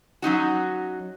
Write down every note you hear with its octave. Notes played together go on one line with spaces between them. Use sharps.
F#3 C#4 D#4 F#4